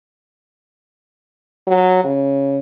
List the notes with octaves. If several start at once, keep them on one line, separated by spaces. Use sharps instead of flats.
F#3
C#3